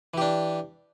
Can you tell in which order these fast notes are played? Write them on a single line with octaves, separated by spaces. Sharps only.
E3 G4 D4